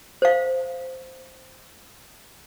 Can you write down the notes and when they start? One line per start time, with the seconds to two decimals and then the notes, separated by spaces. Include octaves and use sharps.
0.22 C5 F5